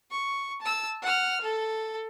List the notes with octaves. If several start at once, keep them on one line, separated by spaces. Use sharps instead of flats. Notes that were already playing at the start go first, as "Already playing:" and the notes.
C#6
A5 E6
F#5 F6
A4